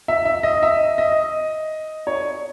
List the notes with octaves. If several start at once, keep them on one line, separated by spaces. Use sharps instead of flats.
E5
E5
D#5
E5
D#5
C#5